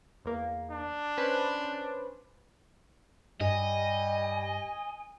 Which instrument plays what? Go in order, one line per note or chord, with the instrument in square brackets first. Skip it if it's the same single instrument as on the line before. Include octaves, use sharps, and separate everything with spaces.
[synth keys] E2 A#3
[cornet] D4
[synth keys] C#4 B4 C5
[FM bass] G2 [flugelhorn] G3 [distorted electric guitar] D#5 [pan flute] G#5